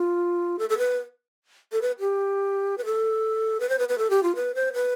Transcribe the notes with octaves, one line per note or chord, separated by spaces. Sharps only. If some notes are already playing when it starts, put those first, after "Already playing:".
Already playing: F4
A4
A4
B4
A4
B4
G4
B4
A4
B4
C5
B4
B4
A4
G4
F4
B4
C5
B4